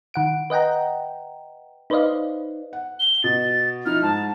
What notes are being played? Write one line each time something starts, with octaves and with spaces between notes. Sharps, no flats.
D#3 F#5 D7
B4 D#5 F#5 G5 A#5
D#4 B4 C5 D5 D#5 F5
F#5
G7
B2 A6
F3 D#4 E4 F6
G#2 A5